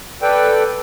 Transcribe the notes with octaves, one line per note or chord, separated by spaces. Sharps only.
A4 B4 D5 G5